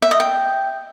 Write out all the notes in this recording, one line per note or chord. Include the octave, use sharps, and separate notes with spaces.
E5
D#5
G5